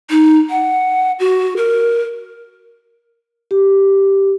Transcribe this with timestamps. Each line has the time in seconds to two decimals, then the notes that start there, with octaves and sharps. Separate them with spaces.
0.10 D#4
0.50 F#5
1.20 F#4
1.57 A#4
3.51 G4